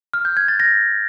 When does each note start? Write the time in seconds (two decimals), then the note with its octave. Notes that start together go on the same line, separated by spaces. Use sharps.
0.14 F6
0.25 G6
0.37 G#6
0.48 A6
0.60 A#6